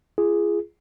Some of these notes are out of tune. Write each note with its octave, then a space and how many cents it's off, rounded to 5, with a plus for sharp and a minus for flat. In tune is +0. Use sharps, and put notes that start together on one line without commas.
F4 -35 G#4 +0